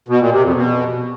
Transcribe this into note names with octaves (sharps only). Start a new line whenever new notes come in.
B2
A#2
C3
F2
B2